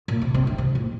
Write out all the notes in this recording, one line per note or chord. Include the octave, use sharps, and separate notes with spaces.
A#2
C3
C3
D3
C3
A#2